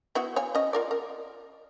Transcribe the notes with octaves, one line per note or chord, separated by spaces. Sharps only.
B3 E4 F#4
C#5 F5 G#5
C#4 D#5
F4 A#4 D5
A#4